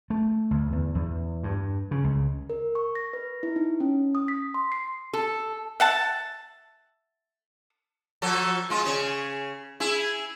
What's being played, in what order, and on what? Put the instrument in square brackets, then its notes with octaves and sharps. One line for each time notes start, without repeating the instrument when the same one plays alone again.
[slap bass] A3
D2
E2
E2
G2
C#3
C#2
[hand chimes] A#4
C#6
A#6
B4
E4
D#4
C#4
D#6
B6
C6
C7
[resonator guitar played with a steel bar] A4
[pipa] E5 F#5 A5
[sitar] F3 F#3 A4
G#3 F4
C#3 G#4 C#5
E4 G#4